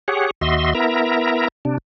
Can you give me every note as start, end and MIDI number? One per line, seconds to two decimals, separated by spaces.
0.08 0.31 67
0.08 0.31 68
0.08 0.31 73
0.08 0.31 78
0.41 0.74 39
0.41 0.74 66
0.41 0.74 75
0.41 0.74 76
0.41 0.74 84
0.75 1.48 59
0.75 1.48 64
0.75 1.48 70
0.75 1.48 76
0.75 1.48 82
1.65 1.78 48
1.65 1.78 62